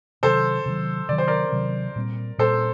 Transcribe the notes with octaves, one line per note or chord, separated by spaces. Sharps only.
C3 D#3 F#3 A4 C5
C3 D#3 F#3
C3 D#3 F#3 D5
C5
A#4 D5
C3 D#3 F#3
A#2 G3 C4
A#2 G3 C4 A4 C5